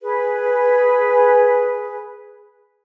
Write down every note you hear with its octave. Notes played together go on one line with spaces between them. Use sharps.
G#4 B4